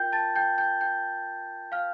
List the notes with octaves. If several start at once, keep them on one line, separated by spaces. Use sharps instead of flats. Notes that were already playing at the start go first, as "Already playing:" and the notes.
Already playing: F4 A#4 G5 G6
A5 A6
G5 G6
G5 G6
G5 G6
F5 F6